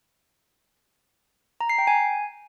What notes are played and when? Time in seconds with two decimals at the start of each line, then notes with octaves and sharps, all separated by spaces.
1.61 A#5
1.69 C7
1.78 G5
1.87 G#5